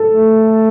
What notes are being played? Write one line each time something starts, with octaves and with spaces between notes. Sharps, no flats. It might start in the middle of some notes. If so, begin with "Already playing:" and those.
Already playing: A4
A3